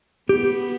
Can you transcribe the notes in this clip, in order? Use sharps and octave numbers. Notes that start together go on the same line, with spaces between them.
B3 G4